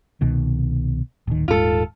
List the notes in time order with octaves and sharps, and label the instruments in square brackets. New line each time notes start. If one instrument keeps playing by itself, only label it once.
[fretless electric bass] C2 B2 D#3
D1 D#3
[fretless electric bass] D#1 G#2 [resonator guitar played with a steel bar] F4 A4